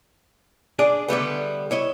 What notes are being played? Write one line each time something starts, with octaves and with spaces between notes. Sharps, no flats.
D4 G#4 D5
D3 G3 A3 B3
E4 C#5 D#5